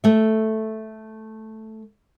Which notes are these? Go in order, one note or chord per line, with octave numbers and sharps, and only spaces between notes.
A3 E5